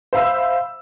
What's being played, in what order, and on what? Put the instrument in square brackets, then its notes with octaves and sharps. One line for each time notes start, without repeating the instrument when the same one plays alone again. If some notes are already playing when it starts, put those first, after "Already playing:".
[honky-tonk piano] C5 E5 F5 B5 E6